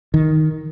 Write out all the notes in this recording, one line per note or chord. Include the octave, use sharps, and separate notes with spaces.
D#3